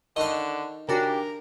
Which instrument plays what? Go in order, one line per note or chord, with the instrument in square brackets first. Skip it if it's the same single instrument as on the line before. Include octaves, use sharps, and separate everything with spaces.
[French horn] D3 [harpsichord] D#3 F5 [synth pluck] D#5 C#6 F#6
[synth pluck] C#3 D4 F#4 [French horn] G4 [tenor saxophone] A#4